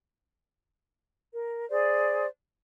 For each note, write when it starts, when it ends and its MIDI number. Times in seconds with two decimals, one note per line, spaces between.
1.33 1.68 70
1.69 2.27 68
1.69 2.27 72
1.69 2.27 74